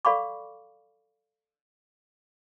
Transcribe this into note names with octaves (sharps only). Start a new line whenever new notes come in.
A4 D5 F5 B5 C#6 D6